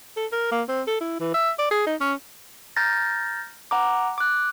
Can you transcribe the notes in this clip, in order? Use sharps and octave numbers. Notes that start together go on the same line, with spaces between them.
A4
A#4
A#3
C4
A4
E4
E3
E5
D5
G#4
D#4
C#4
A#5 F6 G6 A6 A#6
F#5 A#5 D6
D6 F#6